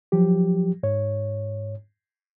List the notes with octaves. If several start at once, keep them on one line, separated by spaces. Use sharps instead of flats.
F3 F#3 G4
G#2 C#5